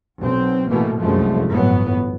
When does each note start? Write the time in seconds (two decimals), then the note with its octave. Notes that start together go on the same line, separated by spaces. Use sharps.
0.21 B1 C4
0.69 A1 B2 E3 A3 A#3
1.00 F1 C2 F#2 F3 G#3 A3
1.50 G1 A2 E3 F#3 B3